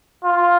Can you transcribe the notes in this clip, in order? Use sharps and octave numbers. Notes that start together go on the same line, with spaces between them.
F4